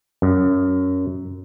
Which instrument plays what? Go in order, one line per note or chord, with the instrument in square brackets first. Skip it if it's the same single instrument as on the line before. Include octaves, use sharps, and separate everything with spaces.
[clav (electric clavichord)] F#2